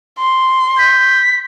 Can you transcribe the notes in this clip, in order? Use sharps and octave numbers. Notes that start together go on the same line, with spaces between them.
C6
G6 B6